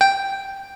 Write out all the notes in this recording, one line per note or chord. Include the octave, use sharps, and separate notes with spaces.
G5